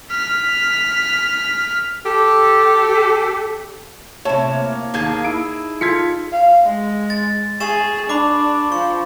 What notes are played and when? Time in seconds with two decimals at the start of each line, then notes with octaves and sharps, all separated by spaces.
0.10 F6 B6
2.06 G4 A4
4.25 A2 C3 C#5 A5 E7
4.49 A#3
4.94 D#2 D#4 G#4 A5 G#6
5.24 E4 D7
5.81 F4 A4 G#6 B6 C#7
6.32 F5
6.64 G#3
7.10 A6
7.60 G#4 C#6 A6 E7
8.09 D4 B5 D6
8.72 F3 C#6